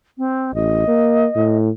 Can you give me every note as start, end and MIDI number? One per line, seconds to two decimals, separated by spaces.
0.18 0.54 60
0.54 0.84 33
0.54 1.56 75
0.88 1.26 58
1.35 1.70 45